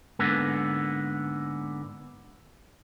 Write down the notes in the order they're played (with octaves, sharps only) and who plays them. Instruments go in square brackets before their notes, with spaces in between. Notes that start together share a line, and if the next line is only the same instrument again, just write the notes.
[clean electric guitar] G#2 D3 A#3 B3